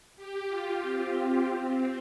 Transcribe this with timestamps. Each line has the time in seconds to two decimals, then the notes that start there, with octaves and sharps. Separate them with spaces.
0.16 G4
0.48 F4
0.81 C4
1.48 C4